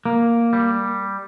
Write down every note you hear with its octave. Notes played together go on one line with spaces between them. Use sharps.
A#3
G3